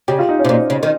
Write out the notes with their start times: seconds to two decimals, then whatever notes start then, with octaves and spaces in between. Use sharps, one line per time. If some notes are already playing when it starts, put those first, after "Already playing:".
0.08 C#3 G4
0.19 F4
0.29 D#4
0.39 C#4
0.45 C3
0.49 A#2 D#4
0.70 C#3
0.83 D#3